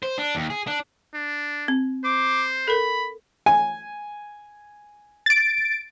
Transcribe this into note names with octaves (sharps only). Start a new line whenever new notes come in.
C5
D4
D#2
G#4
D4
D4
C4
C5 D6
A4 A#4 B5
G#5
A6 D7